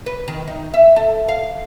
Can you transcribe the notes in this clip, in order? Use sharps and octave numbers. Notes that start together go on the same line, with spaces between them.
B4
D#3
D#4
E5
A4
F5